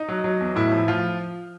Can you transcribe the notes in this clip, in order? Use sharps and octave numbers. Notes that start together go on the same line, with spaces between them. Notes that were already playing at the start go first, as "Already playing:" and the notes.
Already playing: D#4
F#3
F#3
E2
A2 E4
F3
F3 F4